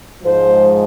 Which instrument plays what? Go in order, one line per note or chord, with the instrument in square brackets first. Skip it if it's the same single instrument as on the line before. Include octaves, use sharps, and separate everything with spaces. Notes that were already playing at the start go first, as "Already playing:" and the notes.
[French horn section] G#2 F3 G#3 C5